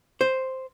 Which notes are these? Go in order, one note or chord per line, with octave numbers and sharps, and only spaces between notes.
C5